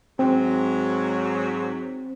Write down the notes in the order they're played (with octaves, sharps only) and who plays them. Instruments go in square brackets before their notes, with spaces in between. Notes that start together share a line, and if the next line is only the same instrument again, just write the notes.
[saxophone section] G#2 F#3 [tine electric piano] C4